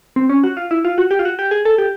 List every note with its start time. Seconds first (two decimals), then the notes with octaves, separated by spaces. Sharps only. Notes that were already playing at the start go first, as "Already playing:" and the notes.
0.16 C4
0.29 C#4
0.44 F#4
0.57 F4
0.71 E4
0.85 F4
0.98 F#4
1.11 G4
1.19 F4
1.25 F#4
1.39 G4
1.51 G#4
1.65 A4
1.78 G4